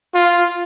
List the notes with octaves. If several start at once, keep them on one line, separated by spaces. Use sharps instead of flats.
F4